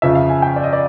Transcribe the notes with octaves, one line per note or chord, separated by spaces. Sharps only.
F2 C#3 F3 E5
F5
G#5
G5
D5
D#5
D5